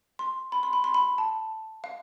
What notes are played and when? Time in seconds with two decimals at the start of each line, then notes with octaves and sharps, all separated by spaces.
0.19 C6
0.52 B5
0.63 C6
0.73 B5
0.84 C6
0.94 B5
1.18 A5
1.84 F5